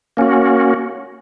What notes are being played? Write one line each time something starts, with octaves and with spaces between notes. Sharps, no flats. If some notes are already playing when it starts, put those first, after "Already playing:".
A#3 C#4 F#4